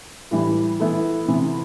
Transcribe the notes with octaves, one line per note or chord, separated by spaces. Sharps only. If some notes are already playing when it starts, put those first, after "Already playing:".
A2 E3 G3
E3 B3 E4 A4
C3 E3 B3